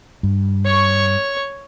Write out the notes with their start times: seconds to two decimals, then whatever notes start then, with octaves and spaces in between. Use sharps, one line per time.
0.23 G2
0.65 C#5 C#6